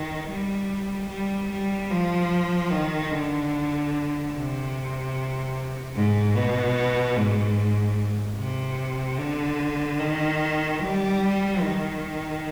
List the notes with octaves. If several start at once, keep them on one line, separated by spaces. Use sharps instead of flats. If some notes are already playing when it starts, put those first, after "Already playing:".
Already playing: D#3
G3
G3
G3
F3
D#3
D3
C3
G#2
B2
G#2
C3
D3
D#3
G3
D#3